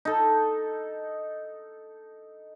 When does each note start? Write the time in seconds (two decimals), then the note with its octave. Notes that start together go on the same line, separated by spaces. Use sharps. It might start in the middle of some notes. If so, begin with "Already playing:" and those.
0.05 D#4 A4